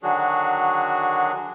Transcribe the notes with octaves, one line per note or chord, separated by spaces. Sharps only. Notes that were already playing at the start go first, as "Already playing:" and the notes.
D3 D#3 F#3 D4 F#4 G#4